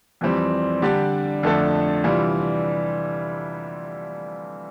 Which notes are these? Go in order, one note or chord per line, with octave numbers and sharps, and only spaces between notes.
F2 E3 G3 C4
D3 G3 D4 G4 D5
F2 D3 A3 D4 A4
C3 E3 G3 D4 F4